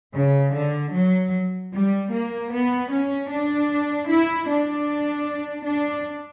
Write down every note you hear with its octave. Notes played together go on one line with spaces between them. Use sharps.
C#3
D3
F#3
G3
A#3
B3
C#4
D4
E4
D4
D4